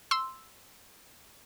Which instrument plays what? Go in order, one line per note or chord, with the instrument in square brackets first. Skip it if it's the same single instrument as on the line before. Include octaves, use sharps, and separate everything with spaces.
[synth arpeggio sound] C6 E6